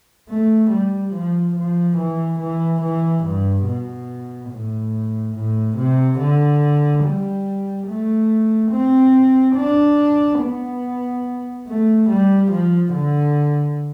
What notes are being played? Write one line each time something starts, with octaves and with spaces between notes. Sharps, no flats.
A3
G3
F3
F3
E3
E3
E3
G2
B2
A2
A2
C3
D3
G3
A3
C4
D4
B3
A3
G3
F3
D3